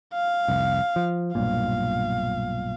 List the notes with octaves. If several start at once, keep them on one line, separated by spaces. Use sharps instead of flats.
F5
F1 C2
F3
B1 G2 A#2 F5